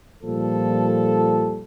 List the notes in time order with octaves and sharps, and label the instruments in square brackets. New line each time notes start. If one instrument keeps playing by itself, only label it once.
[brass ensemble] A#2 F3 G3 A4